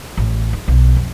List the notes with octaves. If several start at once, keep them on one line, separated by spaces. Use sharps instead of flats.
A1
D#4
B1
F2